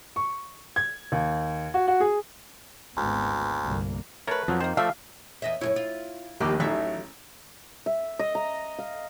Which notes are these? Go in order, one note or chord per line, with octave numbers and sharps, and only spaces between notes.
C#6
G#6
D#2
F#4
F#4
G#4
G#1 D2 B3
G1 C2 A#3
A3 A#4 B4 C#5
F2 F3 F#3
D#3 A#3 C5
F3 A3 D5 E5 F5
E2 D#5 E5
F#2 B2 E4 C#5
F4
A#1 D#2 G3 A#3 G4 D6
A1 F#3 A3 D#4 E5 F5
E5
D#5
A#5
F5